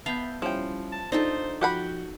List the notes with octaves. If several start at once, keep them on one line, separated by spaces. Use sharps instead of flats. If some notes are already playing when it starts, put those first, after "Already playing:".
B3 E5 F5 A5 B5 G6
F3 G3 C#4 E4 G5
A5
D4 D#4 F4 A4 C5
F3 F#4 G4 F#5 B5 G6